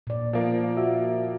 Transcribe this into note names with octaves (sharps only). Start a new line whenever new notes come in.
A#2 D5
F3 A#3
F#4 E5